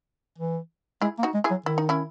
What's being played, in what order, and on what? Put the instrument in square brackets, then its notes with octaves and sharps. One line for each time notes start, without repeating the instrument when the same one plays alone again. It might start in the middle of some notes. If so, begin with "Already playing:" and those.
[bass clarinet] E3
[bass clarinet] G#3 [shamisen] E4 G#4
[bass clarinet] A#3
[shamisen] D#4 F#4
[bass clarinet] G#3
[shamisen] E4 G#4
[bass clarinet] F#3
[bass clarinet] D#3 [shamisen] E4
[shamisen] D#4
C#4 E4